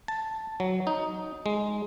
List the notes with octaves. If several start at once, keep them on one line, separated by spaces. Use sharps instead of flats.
A5
F#3
D#4
G#3